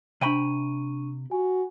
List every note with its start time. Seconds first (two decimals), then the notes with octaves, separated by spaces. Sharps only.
0.21 C3 D4 G5 B5 C#6 D#7
1.31 F#4 G#5